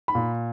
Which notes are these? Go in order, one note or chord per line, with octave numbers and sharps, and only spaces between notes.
B5
A#2